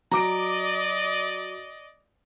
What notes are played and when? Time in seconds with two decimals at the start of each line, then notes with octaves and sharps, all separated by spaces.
0.11 F#3 D5 D#5 A#5 D6 D7